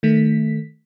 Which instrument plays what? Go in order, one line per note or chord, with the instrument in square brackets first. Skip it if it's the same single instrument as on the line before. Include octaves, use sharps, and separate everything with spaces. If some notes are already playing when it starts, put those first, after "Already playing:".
[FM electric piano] D#3 A3 B6